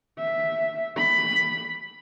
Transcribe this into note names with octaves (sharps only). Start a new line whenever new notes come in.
E5
B5